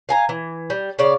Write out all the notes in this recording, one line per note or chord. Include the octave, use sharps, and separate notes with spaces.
F5 G#5 A#5
E3
G3
C#3 D5 F5